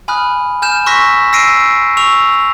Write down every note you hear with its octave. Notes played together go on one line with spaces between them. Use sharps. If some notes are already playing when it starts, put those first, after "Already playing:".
G#5 B5 D#6 F6 F#6
G#5 F6 G6 E7
C6 C#6 E6 F#6 A#6 B6
E6 A#6 C7 D7 D#7
C#6 E6 F7